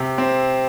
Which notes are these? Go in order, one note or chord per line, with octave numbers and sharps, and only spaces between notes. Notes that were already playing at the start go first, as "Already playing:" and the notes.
Already playing: C3
C4